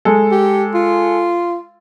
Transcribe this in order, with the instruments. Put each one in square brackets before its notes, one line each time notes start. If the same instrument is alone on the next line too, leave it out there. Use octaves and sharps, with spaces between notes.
[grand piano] G#3 A4
[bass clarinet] G4
F4